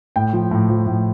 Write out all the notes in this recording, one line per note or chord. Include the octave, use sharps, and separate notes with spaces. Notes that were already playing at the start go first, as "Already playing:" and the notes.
A2 G5
F3
A2
F3
A2